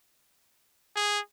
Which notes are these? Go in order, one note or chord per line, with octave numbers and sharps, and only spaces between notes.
G#4